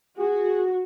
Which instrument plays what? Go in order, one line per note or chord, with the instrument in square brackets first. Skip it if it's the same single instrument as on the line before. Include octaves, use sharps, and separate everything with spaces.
[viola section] F#4 [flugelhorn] G#4